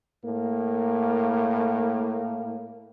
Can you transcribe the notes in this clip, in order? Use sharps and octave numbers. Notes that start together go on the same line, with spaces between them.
A2 A#3